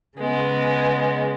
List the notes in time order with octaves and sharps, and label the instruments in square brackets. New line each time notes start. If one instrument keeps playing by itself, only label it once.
[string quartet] C#3 G#3 B3